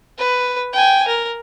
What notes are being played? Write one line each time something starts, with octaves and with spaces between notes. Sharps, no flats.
B4
G5 G#5
A#4